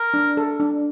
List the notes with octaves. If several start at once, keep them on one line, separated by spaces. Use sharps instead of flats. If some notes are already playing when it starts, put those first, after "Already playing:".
Already playing: A#4
D4
A4
D4